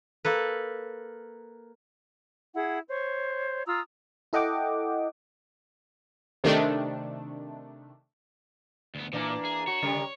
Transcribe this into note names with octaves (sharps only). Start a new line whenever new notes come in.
A#3 A4 B4
E4 G#4 F#5
C5 C#5
F4 A#5 D#6 E6
E4 A4 D#5 F#5 G5 D6
C3 D#3 A3 D4
D2 B3
A#2 E3 A#3 D4
G#4
F#4 C#5
C#3 G3 A#4